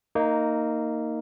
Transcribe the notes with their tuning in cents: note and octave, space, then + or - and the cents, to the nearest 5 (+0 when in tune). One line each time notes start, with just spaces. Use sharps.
A#3 -15 D#4 +0